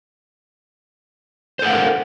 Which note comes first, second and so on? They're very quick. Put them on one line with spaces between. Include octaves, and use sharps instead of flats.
C5 A4 F#5 F5 A#4